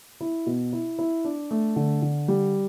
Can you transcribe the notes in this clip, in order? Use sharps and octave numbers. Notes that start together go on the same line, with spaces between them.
E4
B2
E4
E4
D4
A3
D3
D3
G3